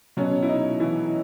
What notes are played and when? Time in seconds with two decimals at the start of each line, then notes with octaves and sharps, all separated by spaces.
0.17 B2 F#3 C#4
0.42 E4
0.49 D#4
0.80 E3 E4